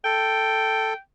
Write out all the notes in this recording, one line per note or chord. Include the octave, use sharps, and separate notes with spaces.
A4 G5